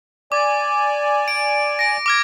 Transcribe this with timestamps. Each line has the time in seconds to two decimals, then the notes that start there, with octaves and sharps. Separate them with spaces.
0.32 D5 G#5 D6
1.28 D7
1.79 A#6 D7
2.06 D6 F6 G#6